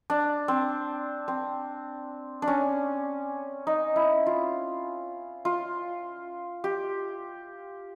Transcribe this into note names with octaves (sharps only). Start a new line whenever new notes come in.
D4
C4
C4
D4
C#4
D#4
E4
F4
F4
G4